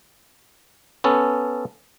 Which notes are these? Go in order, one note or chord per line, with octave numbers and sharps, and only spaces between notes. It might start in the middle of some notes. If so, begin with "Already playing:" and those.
B3 C#4 A4